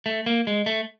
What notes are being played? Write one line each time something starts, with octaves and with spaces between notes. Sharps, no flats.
A3
A#3
G#3
A3